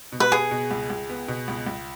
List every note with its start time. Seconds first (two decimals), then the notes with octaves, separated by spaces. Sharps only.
0.12 B2
0.20 B4
0.32 B3 G#4
0.51 B2
0.71 C#2
0.90 C#2
1.10 B3
1.28 B2
1.48 C#2
1.67 C#2